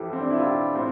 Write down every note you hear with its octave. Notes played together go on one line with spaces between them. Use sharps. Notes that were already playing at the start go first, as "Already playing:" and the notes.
Already playing: F2 E3 G4 A4
C4
D4
E4
F4
G4
A2 C4